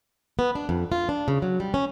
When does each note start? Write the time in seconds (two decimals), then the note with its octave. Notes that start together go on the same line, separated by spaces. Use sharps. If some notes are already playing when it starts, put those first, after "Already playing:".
0.39 B3
0.55 D4
0.69 F2
0.92 F4
1.09 D4
1.28 C#3
1.42 F#3
1.60 G3
1.74 C#4